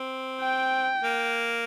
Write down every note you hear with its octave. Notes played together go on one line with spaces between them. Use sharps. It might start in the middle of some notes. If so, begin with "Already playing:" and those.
Already playing: C4
G5
A#3